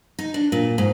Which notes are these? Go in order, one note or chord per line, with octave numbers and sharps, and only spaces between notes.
D#4
D4
A#2
G#2